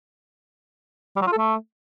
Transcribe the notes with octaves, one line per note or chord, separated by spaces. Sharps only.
G3
F#3
F4
A4
A3